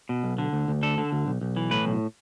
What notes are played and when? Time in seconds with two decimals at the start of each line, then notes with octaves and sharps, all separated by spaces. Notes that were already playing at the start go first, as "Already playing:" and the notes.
0.09 B2
0.24 B1
0.38 D3
0.53 D2
0.68 D2
0.83 D3 A4
0.98 D3
1.12 D2
1.27 B1
1.41 B1
1.56 E3
1.71 A2 B4
1.85 B1